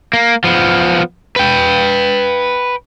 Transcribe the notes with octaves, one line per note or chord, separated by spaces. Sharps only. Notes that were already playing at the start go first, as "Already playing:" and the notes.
A#3
F3 B3
B4 G5